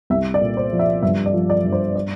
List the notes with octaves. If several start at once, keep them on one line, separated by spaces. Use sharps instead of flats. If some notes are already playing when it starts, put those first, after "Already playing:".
C2 E5
D5
A#2
C5
F3
E5
G2 E5
D5
F3
D5
G2
C5
D5